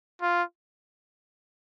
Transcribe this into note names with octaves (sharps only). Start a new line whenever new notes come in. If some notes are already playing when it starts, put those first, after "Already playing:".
F4